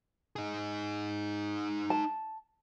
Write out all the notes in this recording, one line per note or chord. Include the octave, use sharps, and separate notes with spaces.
D#4 G#4
A5